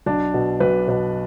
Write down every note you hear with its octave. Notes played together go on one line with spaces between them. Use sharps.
B1 D4
B2
B1 B4
B2 B4